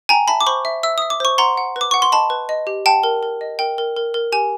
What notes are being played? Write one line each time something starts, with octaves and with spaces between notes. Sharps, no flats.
G5 G#5 A#5
E5 A5 B5
D6
C5 B5 C#6
E5
E5 E6
E5 D#6
D6
C5 C#6
F#5 A#5 C6
F#5
B4
D6
F#5 C#6
C6
D#5 A5 B5
B4
D#5
G4
F#5 G5 A5
A#4
A#4
D#5
A#4 G5
A#4
A#4
A#4
G4 G#5